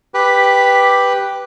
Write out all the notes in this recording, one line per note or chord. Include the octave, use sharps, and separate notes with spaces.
G4 B4